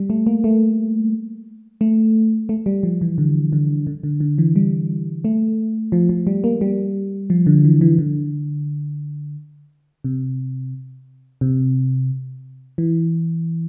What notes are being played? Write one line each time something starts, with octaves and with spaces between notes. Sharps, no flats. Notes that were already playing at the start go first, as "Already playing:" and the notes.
Already playing: G3
A3
A#3
A3
A3
A3
G3
F3
E3
D3
D3
D3
D3
D3
E3
G3
A3
F3
F3
G3
A#3
G3
F3
D3
E3
E3
D3
C3
C3
E3